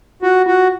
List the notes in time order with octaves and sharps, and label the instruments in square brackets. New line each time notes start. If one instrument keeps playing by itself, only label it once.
[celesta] F4 [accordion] F#4
[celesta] F4 [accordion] F#4